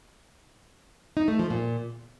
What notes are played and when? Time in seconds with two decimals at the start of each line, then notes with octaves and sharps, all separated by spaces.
1.17 D#4
1.28 A3
1.39 F3
1.50 A#2